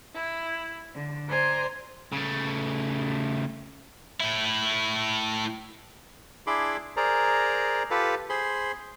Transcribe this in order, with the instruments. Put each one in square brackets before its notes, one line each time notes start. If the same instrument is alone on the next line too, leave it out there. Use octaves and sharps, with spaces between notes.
[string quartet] E4
D3
C5 D5 G#5 A#5 C6
[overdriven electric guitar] C#3 A3
[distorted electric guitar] A2 E4
[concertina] D4 E4 G#4 B5 C6 D6
G#4 A#4 C5 D5 A#5
F4 G4 A4 B4
G#4 C5 B5 C6